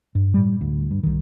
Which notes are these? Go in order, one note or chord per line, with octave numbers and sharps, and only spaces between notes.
G2
A2 G3
D2
G2
C2 D#3